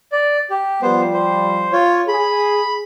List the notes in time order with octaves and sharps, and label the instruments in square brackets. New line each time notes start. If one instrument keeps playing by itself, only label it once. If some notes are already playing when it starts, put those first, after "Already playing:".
[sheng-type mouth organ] D5
G4
[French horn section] F3 G3 [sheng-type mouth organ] B3 C5
[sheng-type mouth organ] C5
F4 C#5
[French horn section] G#4 [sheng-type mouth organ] B5